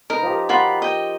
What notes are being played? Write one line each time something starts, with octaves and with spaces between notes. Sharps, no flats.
D#4 A#4 B4
F3 G4
F4 F#4 A#4 B5
D#5 G5